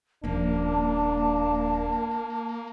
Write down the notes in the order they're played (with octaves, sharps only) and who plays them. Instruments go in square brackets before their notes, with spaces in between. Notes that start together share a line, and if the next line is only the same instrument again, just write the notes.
[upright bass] D#1 F3 [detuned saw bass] A#3 [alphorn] D4 [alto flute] A5